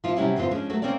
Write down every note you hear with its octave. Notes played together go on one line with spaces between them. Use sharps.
F3 C4 E4 F4
C3 F#3 G3 C#4 D4 E4
F#2 D3 E3 B3 C4 F4
F3 G#3 C#4 D4
F#3 A3 F#4 A4
A#3 C4 C#4 C#5 D5